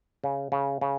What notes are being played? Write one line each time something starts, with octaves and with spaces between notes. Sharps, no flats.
C#3
C#3
C#3